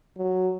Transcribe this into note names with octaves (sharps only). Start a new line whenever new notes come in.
F#3